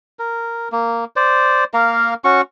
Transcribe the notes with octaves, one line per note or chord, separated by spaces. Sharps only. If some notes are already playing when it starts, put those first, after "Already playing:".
A#4
A#3
C5 D5
A#3 A#4 F5
C#4 F#4 C#6